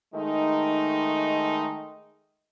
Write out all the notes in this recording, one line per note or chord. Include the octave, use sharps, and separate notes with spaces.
D#3 G#3 A3 D#4